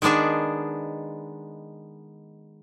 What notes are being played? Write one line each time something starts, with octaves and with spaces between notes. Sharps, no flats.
D#3 G#3 B3 D4 G#4